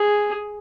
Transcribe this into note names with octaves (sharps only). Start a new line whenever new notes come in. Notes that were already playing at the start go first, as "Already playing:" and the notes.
Already playing: G#4